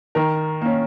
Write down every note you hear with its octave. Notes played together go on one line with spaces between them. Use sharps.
D#3 A#4
A#3 C#4